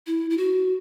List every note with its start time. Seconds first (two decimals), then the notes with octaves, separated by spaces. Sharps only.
0.07 E4
0.30 E4
0.37 F#4